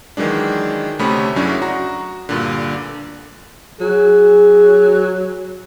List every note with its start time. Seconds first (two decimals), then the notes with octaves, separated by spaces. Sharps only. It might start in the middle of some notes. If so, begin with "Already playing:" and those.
0.17 D#3 E3 F#3 G#3 D4
0.99 D2 C3 A3 C#4 B5 D#6
1.36 F#2 C#3 F#3 C#4 D4 E4
1.62 F#4 A#5
2.29 G2 A#2 D3
3.81 F#3 G#4